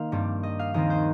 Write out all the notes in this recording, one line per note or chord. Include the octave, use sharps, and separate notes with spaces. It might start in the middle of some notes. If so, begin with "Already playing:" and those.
Already playing: D#3 A#3 C5 D#5 F5
G2 G3 C4
D#5
F5
D#2 D#3 C4 D#5
C5